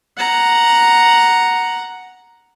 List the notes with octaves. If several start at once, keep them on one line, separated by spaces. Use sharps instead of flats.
F#5 A#5